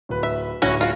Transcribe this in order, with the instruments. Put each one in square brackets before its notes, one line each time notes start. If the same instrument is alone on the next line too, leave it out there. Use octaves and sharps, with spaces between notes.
[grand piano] D1 B4
[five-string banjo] E5
[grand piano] D1 A#6 [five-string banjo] C#4 E4 F#4
[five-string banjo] F4 F#4